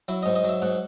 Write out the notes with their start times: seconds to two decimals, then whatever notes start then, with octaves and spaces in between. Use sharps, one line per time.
0.08 F#3 E4
0.23 G#2 D#5
0.36 D#5
0.44 F#3 E5
0.62 G#2 F#5